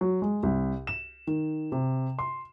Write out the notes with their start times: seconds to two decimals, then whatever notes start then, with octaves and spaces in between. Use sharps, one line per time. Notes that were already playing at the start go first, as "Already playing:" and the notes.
0.01 F#3
0.22 G#3
0.43 C2
0.87 E7
1.27 D#3
1.72 C3
2.19 C6